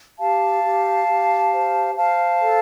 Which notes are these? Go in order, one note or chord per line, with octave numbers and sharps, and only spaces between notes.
G4 F5 A5
G4
G4
C5
C5 F5 A5
A4